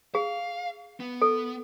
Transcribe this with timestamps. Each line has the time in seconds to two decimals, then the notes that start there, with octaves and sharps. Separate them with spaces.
0.15 G#4 F5
1.00 B3
1.22 A4